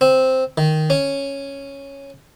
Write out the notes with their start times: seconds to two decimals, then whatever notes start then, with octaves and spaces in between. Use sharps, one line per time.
0.01 C4
0.58 D#3
0.90 C#4